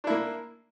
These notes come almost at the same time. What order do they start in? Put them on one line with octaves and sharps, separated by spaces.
D4 E4 A#3